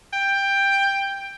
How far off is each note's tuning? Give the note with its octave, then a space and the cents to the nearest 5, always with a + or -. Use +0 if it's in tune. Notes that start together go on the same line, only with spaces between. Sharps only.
G5 +10